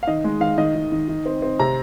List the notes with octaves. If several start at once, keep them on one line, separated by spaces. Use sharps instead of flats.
F5
D#3 D#5
G#3
D#3 F5
D#3 D#5
D#3
D#3
D#3
C4
C4
C3 A#5